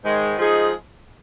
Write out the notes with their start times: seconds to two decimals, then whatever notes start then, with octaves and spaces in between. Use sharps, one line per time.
0.04 G#2 D#3 G#3
0.38 F3 G#3 D#4 G#4